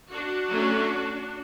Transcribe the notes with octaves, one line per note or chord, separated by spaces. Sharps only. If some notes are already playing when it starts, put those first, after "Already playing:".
D4 F#4
F#3 A3 C#4